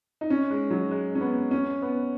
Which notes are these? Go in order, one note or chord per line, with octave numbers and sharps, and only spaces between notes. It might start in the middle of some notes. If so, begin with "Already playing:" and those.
D#4
C#4
G#3
F#3
G#3
C#4
B3
C#4
B3